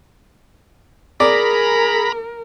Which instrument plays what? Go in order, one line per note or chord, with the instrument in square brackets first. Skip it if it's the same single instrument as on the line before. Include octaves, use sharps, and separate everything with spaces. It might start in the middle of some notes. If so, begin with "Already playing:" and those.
[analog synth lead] G#4 [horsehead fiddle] A#4 [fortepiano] D5 [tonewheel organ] A#5 B5